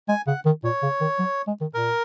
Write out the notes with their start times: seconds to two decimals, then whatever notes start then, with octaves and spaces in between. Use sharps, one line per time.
0.09 G#3 G#5
0.27 C#3 F#5
0.46 D#3
0.64 A#2 C#5
0.83 C#3
1.01 D#3
1.19 F#3
1.47 G#3
1.61 D#3
1.74 A#2 A#4